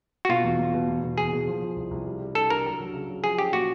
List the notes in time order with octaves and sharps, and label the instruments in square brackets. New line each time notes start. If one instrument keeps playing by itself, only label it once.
[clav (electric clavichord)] F#4
[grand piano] B2 [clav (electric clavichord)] F4
[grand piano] E2
E2
B2
E2
B2
[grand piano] E2 [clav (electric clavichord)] G#4
[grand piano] B2
F3
F3
C2
C2
G3
G3
[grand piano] D4 [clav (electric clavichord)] A4
[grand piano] D4 [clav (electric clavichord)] A#4
[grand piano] F#3
F#3
C#3
F#3
[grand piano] F3 [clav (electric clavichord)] G#4
[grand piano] C#4 [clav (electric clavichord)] G4
[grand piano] A#2 [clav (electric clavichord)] F#4